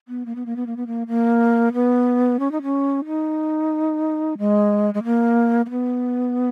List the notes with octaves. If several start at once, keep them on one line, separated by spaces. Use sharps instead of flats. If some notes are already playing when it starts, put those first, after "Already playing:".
B3
A#3
B3
A#3
B3
A#3
B3
A#3
A#3
B3
C#4
D#4
C#4
D#4
G#3
G#3
A#3
A#3
B3